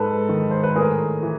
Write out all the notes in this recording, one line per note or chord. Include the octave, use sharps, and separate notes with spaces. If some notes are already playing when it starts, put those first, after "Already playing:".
Already playing: G#2 A4 B4
D#3
C5
B4
A2 G#4 A#4
E3